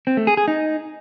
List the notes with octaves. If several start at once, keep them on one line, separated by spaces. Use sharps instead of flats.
C4
A3
G#4
G#4
D#4